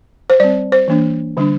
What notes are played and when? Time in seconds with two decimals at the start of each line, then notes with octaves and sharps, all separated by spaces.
0.30 C5
0.40 G3 C4 D5
0.72 C5
0.88 E3 A#3 D4
1.37 D3 G3 D4